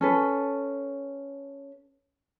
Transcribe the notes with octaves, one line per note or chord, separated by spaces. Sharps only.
C#4 A4 B4